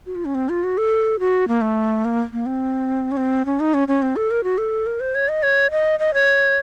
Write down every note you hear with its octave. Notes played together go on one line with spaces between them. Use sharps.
F#4
F4
C#4
C4
F4
F#4
A4
F#4
A#3
A3
A#3
A#3
C4
C#4
C4
C#4
D#4
C#4
C#4
C4
A4
A#4
F#4
A4
A#4
C5
C#5
D#5
C#5
D#5
D#5
C#5